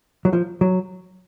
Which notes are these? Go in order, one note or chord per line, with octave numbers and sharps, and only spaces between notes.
F#3
F3
F#3